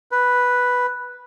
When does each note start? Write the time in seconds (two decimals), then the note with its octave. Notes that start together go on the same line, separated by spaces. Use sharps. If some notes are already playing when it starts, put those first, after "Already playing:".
0.12 B4